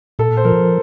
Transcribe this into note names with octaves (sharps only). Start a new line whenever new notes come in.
A#2 A4
C5
F3 A#4